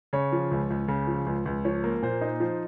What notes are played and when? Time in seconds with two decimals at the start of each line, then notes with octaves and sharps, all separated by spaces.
0.13 C#3 C#5
0.32 F3
0.51 C#2
0.70 C#2
0.88 C#3
1.07 F3
1.26 C#2
1.46 C#2
1.65 F3 C#5
1.84 A#3
2.02 A#2 C5
2.21 D#4
2.40 F3 C5